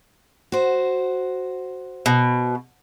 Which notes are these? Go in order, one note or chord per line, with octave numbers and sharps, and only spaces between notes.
F#4 C5
B2